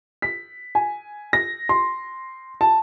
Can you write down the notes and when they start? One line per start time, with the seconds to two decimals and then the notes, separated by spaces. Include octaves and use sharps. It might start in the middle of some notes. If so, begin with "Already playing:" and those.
0.22 B6
0.75 G#5
1.33 A#6
1.69 C6
2.61 A5